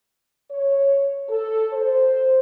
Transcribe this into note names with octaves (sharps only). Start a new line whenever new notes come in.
C#5
A4
C5